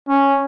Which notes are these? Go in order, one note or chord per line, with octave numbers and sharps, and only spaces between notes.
C#4